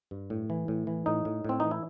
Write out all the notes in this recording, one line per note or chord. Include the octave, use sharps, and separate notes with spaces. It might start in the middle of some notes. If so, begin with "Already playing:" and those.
G2
A2
E3
A2
E3
A2 D#4
A2
A2 C4
E3 D#4
E4